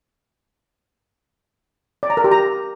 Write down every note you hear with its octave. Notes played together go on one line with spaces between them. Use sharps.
D5
A#5
A#4
G4
A#5